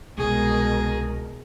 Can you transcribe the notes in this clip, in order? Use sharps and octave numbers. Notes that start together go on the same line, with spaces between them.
C2 B2 G#3 G#4 A#4